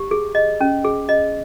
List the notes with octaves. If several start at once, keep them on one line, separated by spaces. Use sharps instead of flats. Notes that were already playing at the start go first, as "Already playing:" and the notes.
Already playing: G4
G#4
D#5
C#4
G#4
D#5